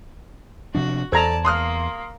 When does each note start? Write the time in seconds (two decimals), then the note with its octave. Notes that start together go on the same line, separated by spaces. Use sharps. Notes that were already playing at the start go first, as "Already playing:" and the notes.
0.75 C3 F3 D4 F#4
1.12 E2 A4 C5 D5 A5 A#5 G#6
1.45 A#3 C6 D#6 F6